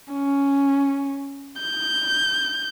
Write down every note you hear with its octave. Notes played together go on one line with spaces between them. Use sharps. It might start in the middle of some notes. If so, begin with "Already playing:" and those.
C#4
G6